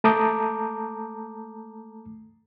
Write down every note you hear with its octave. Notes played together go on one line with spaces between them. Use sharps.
A3 A5 A#5 D6 D#6 G6